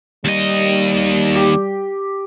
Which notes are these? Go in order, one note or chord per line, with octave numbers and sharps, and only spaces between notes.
D#2 G3 D#5
G4